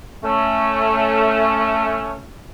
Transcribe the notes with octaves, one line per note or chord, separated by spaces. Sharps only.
A3 C#4